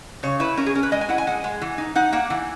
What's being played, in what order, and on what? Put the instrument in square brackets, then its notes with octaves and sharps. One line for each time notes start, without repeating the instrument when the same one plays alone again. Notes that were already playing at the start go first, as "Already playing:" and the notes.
[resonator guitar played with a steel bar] C#3 C#5
E4 B4
C#4 A#4
G#4
C#4 A#4
B4
G#3 D#5
G#5
E4 F#5
G#5
G#3 F#5
G#3
E3
D#4
D#4 F#5
A#3 F#5
E3